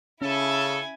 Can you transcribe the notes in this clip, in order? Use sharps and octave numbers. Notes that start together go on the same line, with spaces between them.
C#3 C#4 E4 A4 G#5